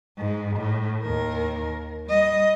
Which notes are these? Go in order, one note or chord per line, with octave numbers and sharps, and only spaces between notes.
G#2
A2
D#2 A#4
G3 D#5